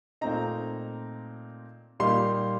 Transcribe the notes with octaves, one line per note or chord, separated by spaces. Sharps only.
A#2 A3 C4 D#4 A#5
A#2 G3 A#3 D#4 C6